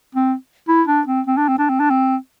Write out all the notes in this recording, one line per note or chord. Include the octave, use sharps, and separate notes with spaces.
C4
E4
D4
C4
C4
D4
C4
D4
C4
D4
C4